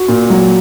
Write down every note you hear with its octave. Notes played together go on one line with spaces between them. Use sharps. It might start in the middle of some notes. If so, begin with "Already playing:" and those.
Already playing: F#4
A#2
F#3